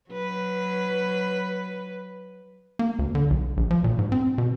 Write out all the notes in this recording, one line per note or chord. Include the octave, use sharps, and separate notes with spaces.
F#3 B4
A#3
D2
D3
B1
A#1
F3
A#2
G#2
C4
B2